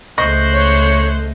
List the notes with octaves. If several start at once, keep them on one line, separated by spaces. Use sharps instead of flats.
C#2 A3 C5 D#5 C#6 F#6 A#6
C#5